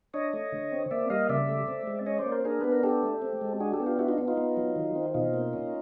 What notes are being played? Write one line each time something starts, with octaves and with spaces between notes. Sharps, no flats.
D4 C#5 D#5
A3
D3
C4
A#3 D5 E5
G3 D#5 F5
C#3 D5 E5
A3
C4
G#3
C#4 C#5 D#5
C5 D5
A#3
A#4 C5
D4 G#4 A#4
B3 B4
A#4
D4 G4 A4
A3
C4
G#3
D4 F#4 G#4
G4 A4
B3
F4 G4
D4 E4 F#4
D#4 F4
B3
D#4 F4
B3
F#3
D#3
C4
B2 D#4 F4
A#3
C#4